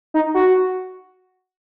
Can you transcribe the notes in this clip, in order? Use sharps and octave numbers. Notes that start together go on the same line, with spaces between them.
D#4
F#4